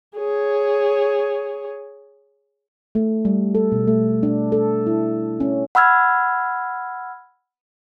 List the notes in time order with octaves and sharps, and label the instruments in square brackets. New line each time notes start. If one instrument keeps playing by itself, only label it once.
[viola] G#4 C#5
[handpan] A3
G3
A4
B2
A3
D4
A4
E4
C#4
[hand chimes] F#5 B5 E6 F6 G#6